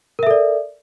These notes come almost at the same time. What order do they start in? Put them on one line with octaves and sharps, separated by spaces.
A#4 E5 A4 D5